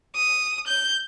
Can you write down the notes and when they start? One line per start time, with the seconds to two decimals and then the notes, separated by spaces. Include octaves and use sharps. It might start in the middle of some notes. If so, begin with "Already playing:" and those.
0.16 D#6
0.67 G6